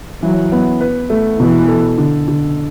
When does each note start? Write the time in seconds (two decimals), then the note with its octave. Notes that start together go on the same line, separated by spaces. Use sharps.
0.22 E3 F#3
0.52 B3
0.81 B4
1.10 A3
1.39 B2 E3
1.68 A4
1.98 D3
2.28 D3